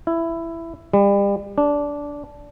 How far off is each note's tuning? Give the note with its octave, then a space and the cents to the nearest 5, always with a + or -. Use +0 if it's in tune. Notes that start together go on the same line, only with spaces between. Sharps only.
E4 +10
G3 +35
D4 -15